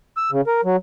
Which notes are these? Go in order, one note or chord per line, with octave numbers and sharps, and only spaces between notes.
E6
C#3
A#4
F#3